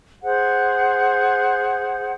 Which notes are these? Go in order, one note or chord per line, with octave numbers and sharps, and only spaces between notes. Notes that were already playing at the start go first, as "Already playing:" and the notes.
G#4 C5 F#5